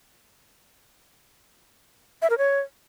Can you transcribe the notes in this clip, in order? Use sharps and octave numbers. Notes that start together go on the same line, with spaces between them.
E5
A#4
C#5